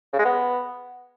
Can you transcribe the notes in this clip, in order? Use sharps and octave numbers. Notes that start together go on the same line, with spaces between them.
C#3
G#3
B3